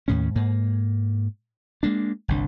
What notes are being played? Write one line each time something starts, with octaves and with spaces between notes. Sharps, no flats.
D#2 A2 C#4
G#2 A#3
G#3 A#3 D4
G1 C2 D4